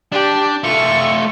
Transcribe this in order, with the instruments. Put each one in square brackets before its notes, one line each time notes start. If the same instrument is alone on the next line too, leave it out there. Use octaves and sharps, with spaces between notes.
[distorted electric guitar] D4 [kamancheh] G4
[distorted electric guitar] A3 F4 [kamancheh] C#6